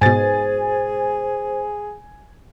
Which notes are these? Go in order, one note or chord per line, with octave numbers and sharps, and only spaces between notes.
G#2 B2 G#4 C5 G#5 A6